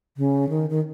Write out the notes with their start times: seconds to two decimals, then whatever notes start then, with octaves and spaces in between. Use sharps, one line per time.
0.17 C#3
0.49 D#3
0.70 D#3